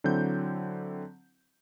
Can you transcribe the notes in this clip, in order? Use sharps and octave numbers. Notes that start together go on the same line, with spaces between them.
D3 F#3 C4 E4 G6